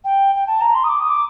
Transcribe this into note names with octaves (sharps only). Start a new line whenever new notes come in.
G5
G5
A5
A#5
C6
D#6
D6
D#6
D6